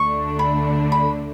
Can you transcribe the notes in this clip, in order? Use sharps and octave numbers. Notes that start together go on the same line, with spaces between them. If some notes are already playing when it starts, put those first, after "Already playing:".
Already playing: D2 D3 A3 D4 C#6
B5
B5